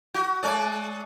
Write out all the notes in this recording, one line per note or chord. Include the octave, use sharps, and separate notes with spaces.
F#4
G#3 C#4 D5